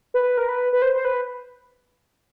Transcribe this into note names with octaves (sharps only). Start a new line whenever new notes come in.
B4
A#4
B4
B4
C5
C5
B4